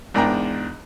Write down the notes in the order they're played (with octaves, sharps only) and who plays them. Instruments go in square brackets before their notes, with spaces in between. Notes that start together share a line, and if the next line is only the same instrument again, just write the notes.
[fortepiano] E2 G#2 D4 A#4 G5 A#5